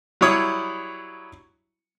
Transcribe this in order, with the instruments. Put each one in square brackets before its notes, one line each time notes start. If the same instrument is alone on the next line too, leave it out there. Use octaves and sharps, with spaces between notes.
[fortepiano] F#3 G3 E4 C#5 D#6